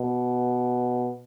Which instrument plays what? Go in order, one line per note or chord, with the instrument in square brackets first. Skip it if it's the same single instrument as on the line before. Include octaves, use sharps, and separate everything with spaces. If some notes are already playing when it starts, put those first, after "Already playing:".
Already playing: [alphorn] B2